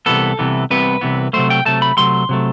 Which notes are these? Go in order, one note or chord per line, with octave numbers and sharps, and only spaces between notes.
C2 C3 E3 B3 A4
C2 C3 E3 B3
C2 C3 E3 B3 B4
C2 C3 E3 B3
C3 F#3 A3 C5
G5
C3 F#3 A3 A5
B5
C3 F#3 A3 C6
C3 F#3 A3